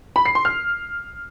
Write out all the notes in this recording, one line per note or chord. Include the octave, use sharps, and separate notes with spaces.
B5
C7
C6
F6